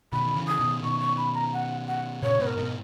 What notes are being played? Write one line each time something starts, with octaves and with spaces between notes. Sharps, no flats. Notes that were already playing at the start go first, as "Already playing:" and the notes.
B2 D#3 B5
D#3
C#3 E3
D#6
B2 D#3
B2 D#3 C#6
C#6
B5
A#5
F#5
F#5
A#2 C#3 C#5
G#2 B2 B4
A#4
G#2 B2